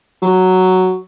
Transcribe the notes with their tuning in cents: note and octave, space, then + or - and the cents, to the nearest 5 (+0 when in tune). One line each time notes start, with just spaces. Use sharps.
F#3 +5